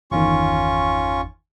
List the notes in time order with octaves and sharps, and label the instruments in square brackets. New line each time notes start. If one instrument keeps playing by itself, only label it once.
[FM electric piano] G1 E2 D#3 [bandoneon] C#4 F4 C#6